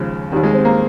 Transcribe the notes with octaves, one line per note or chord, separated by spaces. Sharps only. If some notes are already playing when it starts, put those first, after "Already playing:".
Already playing: D#2 C#3 F3 G#3
D#2 D#3 G3
G#3
C4
A#3